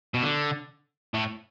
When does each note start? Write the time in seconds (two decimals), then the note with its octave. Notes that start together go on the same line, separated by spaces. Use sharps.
0.14 B2
0.23 D3
1.14 A2